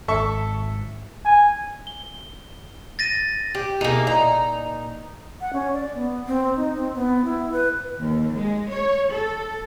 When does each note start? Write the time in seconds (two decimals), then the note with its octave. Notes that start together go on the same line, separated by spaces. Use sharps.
0.08 G#1 A4 E5 C#6
1.25 G#5
1.87 G7
2.99 A6 A#6 D#7
3.55 G4
3.81 B2 A#3 D#4 E4 G#4
4.07 A#2 D#4 A#5
5.41 F#5
5.53 C#4
5.73 D5
5.95 B3
6.27 C4
6.56 D#4
6.76 C4
6.96 B3
7.25 E4
7.52 B4
8.01 D#2
8.35 G#3
8.71 C#5
9.11 A4